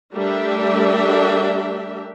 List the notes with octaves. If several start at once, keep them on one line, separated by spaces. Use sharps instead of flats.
G3 A3 D4 G4 A#4 E5